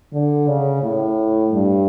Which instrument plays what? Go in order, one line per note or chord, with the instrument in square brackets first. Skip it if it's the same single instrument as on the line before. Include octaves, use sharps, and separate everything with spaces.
[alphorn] D3
C#3
A2
G2